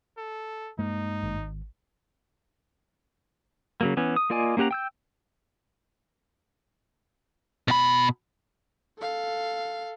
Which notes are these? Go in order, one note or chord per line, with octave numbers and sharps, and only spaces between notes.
A4
G2 G#3 A#3 D#4
G#1
C#3 F#3 A#3
E3 B3 C#4
D#6
A#3 F4 D5 D#5 G#5
A#3 C#4 G4 F#5 A#5
G5 E6 G6
B2 B5
A4 F5